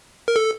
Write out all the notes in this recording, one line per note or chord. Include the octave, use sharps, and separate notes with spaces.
A#4
A4